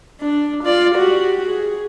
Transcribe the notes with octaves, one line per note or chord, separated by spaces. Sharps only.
D4
F4 D5
F#4 G4
G#4